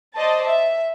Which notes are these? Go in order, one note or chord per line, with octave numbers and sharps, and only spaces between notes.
C5 D5 D#5 A5
E5